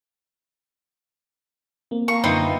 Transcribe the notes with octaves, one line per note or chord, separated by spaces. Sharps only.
A#3 C4
A#3 A#4 C#6
F#2 D3 B3 C4 D#4 F4 E5